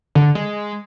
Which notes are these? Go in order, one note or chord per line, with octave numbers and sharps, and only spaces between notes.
D3
G#3